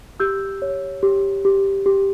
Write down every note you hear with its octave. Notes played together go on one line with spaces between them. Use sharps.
G4 E6 G6
C#5
G4
G4
G4